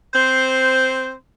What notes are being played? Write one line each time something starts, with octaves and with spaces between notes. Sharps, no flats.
C4 C5